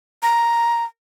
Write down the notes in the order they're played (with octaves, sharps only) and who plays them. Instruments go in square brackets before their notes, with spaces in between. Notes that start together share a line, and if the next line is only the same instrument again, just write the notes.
[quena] A#5